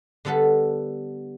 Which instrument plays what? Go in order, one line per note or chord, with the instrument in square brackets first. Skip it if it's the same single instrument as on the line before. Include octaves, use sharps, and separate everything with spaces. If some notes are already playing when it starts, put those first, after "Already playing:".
[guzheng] D3 G3 B3 A4 B4